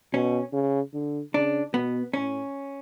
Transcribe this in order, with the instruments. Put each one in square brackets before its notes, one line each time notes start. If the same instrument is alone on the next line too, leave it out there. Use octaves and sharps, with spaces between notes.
[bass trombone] B2 [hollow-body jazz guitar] C#4
[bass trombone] C#3
D3
[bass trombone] C#3 [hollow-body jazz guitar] D4
[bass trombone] B2 [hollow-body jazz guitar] B3
[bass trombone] A2 [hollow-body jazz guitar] C#4